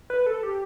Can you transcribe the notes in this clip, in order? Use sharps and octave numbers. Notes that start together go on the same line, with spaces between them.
B4
A4
G4